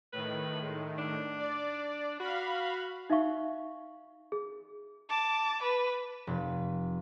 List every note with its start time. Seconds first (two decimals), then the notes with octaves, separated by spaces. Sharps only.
0.13 A2 D#3 B4
0.62 G#3
0.98 D4
1.39 D5
2.20 F#4 F5 B5
3.10 D#4 E5 F5 C#6
4.32 G#4
5.10 A5 D6
5.62 B4
6.27 F1